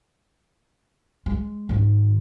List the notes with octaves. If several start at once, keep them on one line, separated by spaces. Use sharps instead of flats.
G#3
G#2 D#3